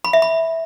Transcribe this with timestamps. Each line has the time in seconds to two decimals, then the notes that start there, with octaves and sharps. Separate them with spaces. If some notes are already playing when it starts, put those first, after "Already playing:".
0.05 B5
0.13 E5
0.22 B5